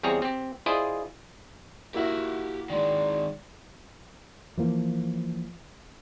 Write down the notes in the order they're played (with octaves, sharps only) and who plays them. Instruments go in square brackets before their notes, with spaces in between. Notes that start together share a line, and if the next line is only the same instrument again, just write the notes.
[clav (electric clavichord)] E2 G3 C4 G#4 C#5 A#5
C4 G4
E4 F4 G#4 C5 D5 D#5
[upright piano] A#3 E4 F#4 [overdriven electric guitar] G4 F#5
[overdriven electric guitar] D#3 G#3 [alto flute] D5
[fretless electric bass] E3 F3 A#3